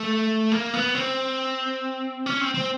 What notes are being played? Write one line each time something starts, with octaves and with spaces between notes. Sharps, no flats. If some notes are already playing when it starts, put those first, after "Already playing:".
Already playing: A3
A#3
B3
C4
C#4
C4
C4